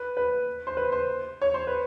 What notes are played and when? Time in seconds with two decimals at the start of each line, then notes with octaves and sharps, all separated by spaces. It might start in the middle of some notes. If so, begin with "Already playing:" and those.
Already playing: B4
0.17 B4
0.67 C5
0.77 B4
0.92 C5
1.42 C#5
1.54 C5
1.67 B4